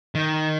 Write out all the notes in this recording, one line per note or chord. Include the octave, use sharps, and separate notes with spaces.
D#3